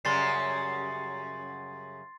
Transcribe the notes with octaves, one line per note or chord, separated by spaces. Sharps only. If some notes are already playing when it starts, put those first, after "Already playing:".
F#2 C#3 G3 C6 A6 C7